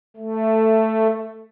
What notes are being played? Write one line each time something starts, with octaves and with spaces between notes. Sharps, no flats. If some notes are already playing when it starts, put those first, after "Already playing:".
A3